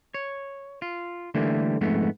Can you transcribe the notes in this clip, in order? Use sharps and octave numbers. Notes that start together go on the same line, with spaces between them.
C#5
F4
D3 E3 G3 A3 A#3
F2 G#2 A3 B3